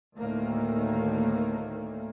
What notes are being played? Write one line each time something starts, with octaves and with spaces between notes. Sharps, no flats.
D2 A2 D#3 A3 A#3